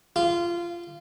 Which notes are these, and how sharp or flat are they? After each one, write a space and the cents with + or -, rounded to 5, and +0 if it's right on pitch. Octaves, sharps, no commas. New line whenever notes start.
F4 -20